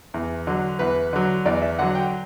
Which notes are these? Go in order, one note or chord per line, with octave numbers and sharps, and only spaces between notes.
E2
D3 F#3
E2 B4
D3 F#3
E2 D5
E5
D3 F#3 F#5
G5